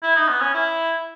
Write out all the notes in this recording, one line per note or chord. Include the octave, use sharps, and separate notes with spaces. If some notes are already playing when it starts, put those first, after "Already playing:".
E4
D#4
B3
C#4
E4